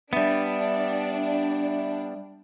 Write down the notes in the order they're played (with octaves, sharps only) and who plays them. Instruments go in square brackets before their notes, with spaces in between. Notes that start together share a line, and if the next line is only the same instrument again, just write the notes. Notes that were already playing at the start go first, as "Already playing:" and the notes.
[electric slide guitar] G3 B3 [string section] D4 [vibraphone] E5